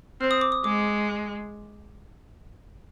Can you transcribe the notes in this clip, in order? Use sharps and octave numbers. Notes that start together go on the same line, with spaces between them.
C4 F6
D#6
D6
D#6
G#3 D6